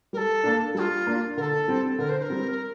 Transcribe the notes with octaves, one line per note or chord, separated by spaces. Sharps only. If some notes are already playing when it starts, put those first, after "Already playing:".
G3 A4 A#4
A#3 D4
G3 F4 A4
A#3 D4
D3 A4 A#4
G3 C4
D3 A#4
C5
C5
A#4
G3 C4
A#4